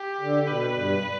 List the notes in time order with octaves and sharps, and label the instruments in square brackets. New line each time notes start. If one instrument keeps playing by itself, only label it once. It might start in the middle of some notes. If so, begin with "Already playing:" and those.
Already playing: [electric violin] G4
[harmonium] D3
[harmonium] B2 [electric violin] B4
[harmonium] G2